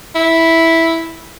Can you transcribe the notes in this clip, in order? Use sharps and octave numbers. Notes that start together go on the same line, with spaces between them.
E4